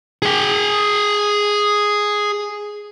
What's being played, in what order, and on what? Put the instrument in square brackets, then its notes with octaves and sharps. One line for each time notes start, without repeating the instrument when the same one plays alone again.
[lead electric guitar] G#4 G5